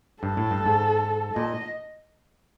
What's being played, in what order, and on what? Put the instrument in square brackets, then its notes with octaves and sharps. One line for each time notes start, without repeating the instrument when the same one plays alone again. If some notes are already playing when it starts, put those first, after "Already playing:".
[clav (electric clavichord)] G2 [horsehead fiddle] A4
[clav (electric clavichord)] A2
G2
G#2
[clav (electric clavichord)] A#2 [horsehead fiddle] D#5